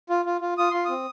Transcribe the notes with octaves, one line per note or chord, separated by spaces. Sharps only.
F4
F4
F4
F4 D#6
F4 C6
C4 D#6